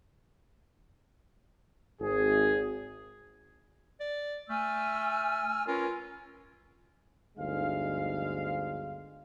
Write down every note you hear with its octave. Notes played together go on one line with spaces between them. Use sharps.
G#1 G#4
D5
A3 G#5 E6 F6
C#4 F4 A#4 B4
G1 D2 G#3 D#4 F5